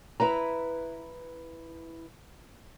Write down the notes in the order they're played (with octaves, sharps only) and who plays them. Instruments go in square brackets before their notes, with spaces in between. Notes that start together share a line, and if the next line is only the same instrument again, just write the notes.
[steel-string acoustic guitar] E4 B4 A#5